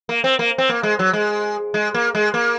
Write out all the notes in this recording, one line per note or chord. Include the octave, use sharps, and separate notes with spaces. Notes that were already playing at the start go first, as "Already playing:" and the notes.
A#3
C4
A#3
C4
A#3
G#3
F#3
G#3
G#3
A#3
G#3
A#3